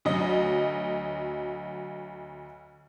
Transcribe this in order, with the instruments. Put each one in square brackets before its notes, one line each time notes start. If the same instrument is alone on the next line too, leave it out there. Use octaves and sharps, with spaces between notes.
[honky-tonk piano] D2 F#3 D#5